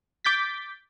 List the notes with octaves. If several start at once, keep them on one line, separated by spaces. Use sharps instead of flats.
D6 G6 A6 B6